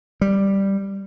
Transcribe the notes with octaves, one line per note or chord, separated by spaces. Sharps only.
G3